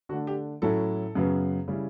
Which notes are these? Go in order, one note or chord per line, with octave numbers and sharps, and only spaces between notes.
D3 A3 D4 F#4
G4
A2 F#3 C#4 E4 A4
F#2 C#3 F#3 B3
C#3 G3 C#4 E4